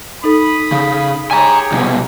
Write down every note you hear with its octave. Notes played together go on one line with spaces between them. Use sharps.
D#4 A4 B5 D#6
C#3
G4 G#4 C#5 G#5 A#5
C2 B2